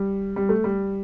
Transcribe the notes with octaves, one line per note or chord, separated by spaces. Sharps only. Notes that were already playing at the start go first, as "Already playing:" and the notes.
Already playing: G3
G3
A3
G3